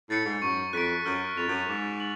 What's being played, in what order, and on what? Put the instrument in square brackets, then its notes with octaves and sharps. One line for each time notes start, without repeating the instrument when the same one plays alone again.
[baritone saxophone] A2 [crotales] A6 C#7
[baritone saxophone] G#2
[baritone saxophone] F#2 [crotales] C#6
[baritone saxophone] F2 [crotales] F#6 B6 D7
[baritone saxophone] F#2 [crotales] F6
[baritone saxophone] F2 [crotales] A6 F7
[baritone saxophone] F#2
[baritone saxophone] G#2 [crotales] D6
[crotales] F#7